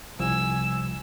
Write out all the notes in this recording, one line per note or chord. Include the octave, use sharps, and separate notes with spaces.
C2 F3 G#5 E6